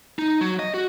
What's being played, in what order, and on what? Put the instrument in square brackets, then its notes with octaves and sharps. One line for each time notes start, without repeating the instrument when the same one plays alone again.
[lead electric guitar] D#4
F#3
D#5
F#4